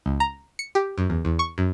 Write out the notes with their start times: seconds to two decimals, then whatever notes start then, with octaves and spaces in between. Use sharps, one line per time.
0.06 C#2
0.20 A#5
0.59 C#7
0.75 G4
0.98 F#2
1.10 E2
1.25 E2
1.39 C#6
1.58 F#2